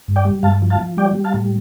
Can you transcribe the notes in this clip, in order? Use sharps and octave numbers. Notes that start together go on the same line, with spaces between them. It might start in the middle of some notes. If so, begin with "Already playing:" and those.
G2
D5 G5
G3
G2 F5 A5
F3
F5 A5
F3
G3 D5 G5
G3
F5 A5
A2